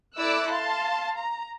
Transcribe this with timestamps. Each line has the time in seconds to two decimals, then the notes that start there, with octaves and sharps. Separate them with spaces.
0.18 E4 A4 D5 D6 E6 F#6
0.48 F5 A5 C6
1.17 A#5